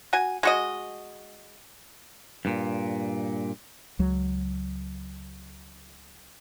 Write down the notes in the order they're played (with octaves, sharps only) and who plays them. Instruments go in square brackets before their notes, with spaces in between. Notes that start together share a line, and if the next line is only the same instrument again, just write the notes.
[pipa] F#4 G#5
G#3 F#4 D#5
[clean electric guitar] G2 A#2
[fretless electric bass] C#2 F#3